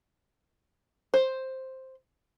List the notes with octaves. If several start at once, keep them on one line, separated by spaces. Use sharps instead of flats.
C5